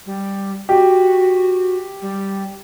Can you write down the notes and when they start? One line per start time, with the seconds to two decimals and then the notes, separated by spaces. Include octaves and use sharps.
0.06 G3
0.69 F#4 G4
2.02 G3